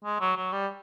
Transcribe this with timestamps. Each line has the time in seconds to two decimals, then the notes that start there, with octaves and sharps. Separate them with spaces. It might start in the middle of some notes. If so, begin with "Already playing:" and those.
0.04 G#3
0.20 F#3
0.36 F#3
0.52 G3